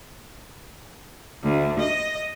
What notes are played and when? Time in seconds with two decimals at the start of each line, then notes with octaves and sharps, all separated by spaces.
1.43 D2
1.79 D#5